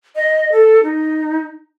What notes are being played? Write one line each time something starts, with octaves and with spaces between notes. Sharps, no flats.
D#5
A4
D#4